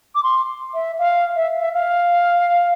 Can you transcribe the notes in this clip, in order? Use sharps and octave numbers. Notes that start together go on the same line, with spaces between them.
D6
C6
E5
F5
E5
E5
F5